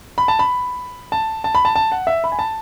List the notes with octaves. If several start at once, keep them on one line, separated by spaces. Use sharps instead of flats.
B5
A5
B5
A5
A5
B5
A5
A5
F#5
E5
B5
G#5
A5